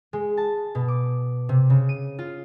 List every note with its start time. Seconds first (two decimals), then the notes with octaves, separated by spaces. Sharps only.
0.13 G#3
0.37 A5
0.75 B2
0.88 D6
1.49 C3
1.70 C#3
1.89 D#7
2.19 F4